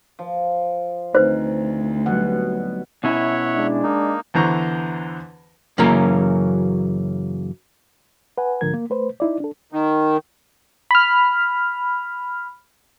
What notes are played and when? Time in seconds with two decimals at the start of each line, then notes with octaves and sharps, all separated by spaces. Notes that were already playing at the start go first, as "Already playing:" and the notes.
0.19 F3
1.15 D2 C4 D#4 B4 C5
2.06 B2 F#3 G3 F#5
3.04 B2 C#4 E4 C#5 E5 F#5
3.54 G#3 D4
3.83 A#3 D#4
4.34 E2 D3 E3 C5 A#5 C#6
5.78 F#2 C#3 E3 F#3 A#3 C#4
8.38 B4 F#5 G#5
8.61 C2 G#2 D3 F3 A#4 G#6
8.74 A#3
8.90 A3 B4 C5
9.20 D#4 E4 D5
9.40 D4 A4
9.72 D#3
10.91 B5 F6